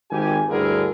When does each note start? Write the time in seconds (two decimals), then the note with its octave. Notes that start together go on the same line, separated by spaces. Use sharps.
0.11 G#1 G4 G#5
0.49 D2 G2 D3 E4 G#4 A#4